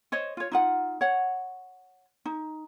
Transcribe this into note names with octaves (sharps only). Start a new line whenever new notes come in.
C5 C#5 D#5
F4 C#5
D#4 F4 F#5
C#5 F#5
D#4